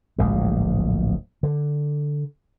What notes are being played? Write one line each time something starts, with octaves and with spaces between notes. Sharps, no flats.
D1 A#1 G#2 G#3
D3